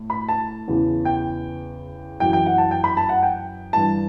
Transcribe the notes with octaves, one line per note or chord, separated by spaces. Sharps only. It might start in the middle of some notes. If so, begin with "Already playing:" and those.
Already playing: A2
B5
A5
E2 C#3 E3
G5
F#2 E3 G5
G5
F#5
A5
G5
B5
A5
F#5
G5
G2 E3 A5